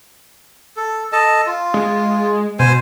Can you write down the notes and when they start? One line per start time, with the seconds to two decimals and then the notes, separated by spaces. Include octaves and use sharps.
0.76 A4
1.12 A4 D#5 A5
1.46 F4
1.74 G#3
2.59 B2 C5 G#5